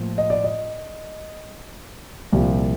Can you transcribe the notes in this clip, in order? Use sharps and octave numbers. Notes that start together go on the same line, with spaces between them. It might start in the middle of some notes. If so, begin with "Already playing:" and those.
Already playing: A2 F3 A#3
D#5
D5
D#5
C2 A#2 F3 A#3